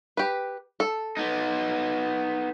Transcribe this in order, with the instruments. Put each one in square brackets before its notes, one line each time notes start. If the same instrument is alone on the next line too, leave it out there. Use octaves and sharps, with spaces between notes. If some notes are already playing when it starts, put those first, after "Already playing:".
[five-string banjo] G4 B4
A4
[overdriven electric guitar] B3 D#4